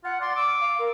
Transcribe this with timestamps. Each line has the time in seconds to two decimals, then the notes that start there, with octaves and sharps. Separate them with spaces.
0.04 F4 F#5
0.21 D5 C6
0.35 D6 E6
0.60 F5
0.78 A#4